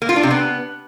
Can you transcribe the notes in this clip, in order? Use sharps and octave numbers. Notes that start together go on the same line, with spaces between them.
A#3
F4
D4
C3
B3